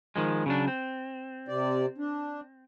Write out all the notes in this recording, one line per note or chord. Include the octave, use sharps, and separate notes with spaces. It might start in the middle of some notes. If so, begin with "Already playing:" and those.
D#3 F3 G#3
C#3 F#3 D4
C4
C3 D5
D4